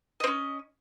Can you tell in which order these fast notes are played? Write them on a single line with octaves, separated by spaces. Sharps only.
D#5 C4 C#4